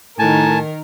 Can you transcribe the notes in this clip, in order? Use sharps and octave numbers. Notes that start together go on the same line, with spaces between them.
A2 D#3 A#4 G#5 A5